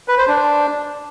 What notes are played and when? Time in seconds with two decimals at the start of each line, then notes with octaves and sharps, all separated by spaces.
0.08 B4
0.18 C5
0.28 D4